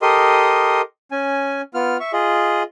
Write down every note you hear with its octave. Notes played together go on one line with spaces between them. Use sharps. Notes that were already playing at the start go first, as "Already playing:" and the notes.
G4 A4 A#4 D#5 C6 D#6
C#4 G#5
B3 F4 F6
E5 C#6
F4 G#4 D#5